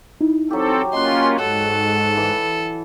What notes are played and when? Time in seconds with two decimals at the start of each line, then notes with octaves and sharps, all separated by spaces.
0.21 D#4 E4
0.50 F#3 C4 G4 A4
0.93 A#3 C#4 F4 D#5 G5 C6 F#6
1.39 G#2 A4 F#5
2.17 E3